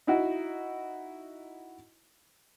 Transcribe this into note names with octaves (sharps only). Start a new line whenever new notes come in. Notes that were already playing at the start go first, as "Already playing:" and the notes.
D#4 E4 F#4